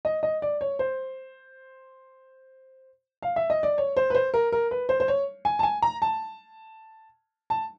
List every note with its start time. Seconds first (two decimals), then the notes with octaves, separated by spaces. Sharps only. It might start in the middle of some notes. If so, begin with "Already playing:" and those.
0.05 D#5
0.23 D#5
0.42 D5
0.61 C#5
0.79 C5
3.22 F5
3.36 E5
3.50 D#5
3.63 D5
3.78 C#5
3.97 C5
4.10 B4
4.15 C5
4.34 A#4
4.52 A#4
4.71 B4
4.89 C5
5.00 C5
5.08 C#5
5.45 G#5
5.59 A5
5.63 G#5
5.82 A#5
6.02 A5
7.50 A5